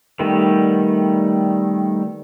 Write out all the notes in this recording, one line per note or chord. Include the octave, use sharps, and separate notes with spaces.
D#3 G3 A3 B3